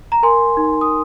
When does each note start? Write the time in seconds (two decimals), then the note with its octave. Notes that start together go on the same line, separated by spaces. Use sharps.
0.12 A#5
0.23 A#4 G#5 C6
0.57 D#4
0.81 D#6